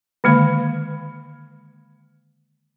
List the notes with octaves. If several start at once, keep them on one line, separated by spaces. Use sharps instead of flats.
D3 D#3 G#3 A#3 F5 B5